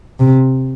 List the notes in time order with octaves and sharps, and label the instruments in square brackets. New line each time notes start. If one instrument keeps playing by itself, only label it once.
[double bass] C3